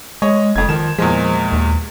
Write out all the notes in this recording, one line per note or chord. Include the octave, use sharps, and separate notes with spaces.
G#3 C#5 D#5
F#1 F2 G#6
D#3 F3 E7
E2 A#2 F3 G#3
D#2